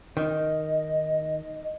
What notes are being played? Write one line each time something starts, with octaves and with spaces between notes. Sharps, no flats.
D#3 D#5